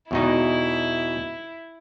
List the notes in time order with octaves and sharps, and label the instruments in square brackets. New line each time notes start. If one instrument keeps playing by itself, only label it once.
[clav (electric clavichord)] E2 B2 D#4 [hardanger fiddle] E4